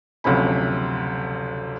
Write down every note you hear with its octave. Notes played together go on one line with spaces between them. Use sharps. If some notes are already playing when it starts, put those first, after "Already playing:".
F#1 D2 C3 F3 C#4 B5